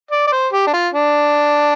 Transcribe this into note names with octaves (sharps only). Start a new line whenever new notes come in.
D5
D5
C5
G4
D4
F4
D4